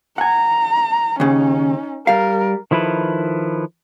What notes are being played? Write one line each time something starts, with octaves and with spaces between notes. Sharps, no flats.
F#5 G#5 A#5
D#2 C#3 C#4 D#4
G3 A#4 F5
D#3 F3 E4 A4 B4